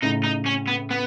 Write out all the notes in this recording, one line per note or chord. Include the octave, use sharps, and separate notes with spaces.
A2 C#3 D#4
D#4
C#4
B3
B3